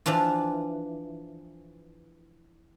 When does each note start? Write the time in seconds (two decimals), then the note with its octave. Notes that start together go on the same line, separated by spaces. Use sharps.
0.06 E3 F3 D4 F4